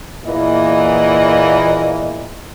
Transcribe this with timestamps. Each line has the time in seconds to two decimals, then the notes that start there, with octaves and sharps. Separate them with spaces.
0.24 E2 A#2 E3 A#3 D#5